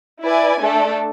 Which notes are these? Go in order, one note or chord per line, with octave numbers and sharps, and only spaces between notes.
E4 B4 D5 G#5
A3 D4 A4